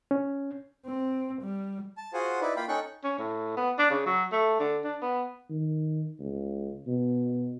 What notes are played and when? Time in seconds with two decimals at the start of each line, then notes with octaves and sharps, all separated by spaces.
0.11 C#4
0.87 C4
1.42 G3
1.97 A5
2.14 F4 F#4 G#4 C5 F#5 G#5
2.41 D#4 E4 B4 D5
2.56 A#3 F4 F5 G5 B5
2.68 C#4 D#4 A4 G5 C#6 F#6
3.04 C#4
3.19 A2
3.57 B3
3.79 D4
3.91 C#3
4.06 F#3
4.32 A3
4.60 D3
4.84 D4
5.02 B3
5.50 D#3
6.20 C#2
6.87 B2